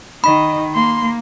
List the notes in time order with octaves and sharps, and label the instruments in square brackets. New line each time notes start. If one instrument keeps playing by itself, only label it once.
[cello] D#3 [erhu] D#5 [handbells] B5
[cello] A#3 [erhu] C6